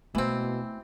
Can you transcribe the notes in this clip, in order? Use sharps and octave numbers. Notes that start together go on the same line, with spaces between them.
B2 E3 A3 C4 E4